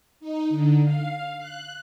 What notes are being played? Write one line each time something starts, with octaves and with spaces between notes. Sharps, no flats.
D#4
D3
F5
F#6